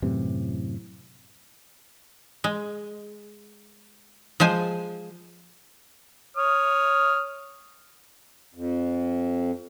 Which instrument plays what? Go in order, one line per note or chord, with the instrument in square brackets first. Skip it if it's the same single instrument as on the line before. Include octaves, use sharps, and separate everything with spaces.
[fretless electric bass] F#2 A2 C3 E3
[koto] G#3
F3 G#3 C5 G#5
[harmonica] C#5 D#6 F6
[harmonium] F2